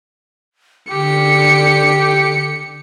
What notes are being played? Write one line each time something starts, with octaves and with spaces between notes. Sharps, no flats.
D3 G4 C#7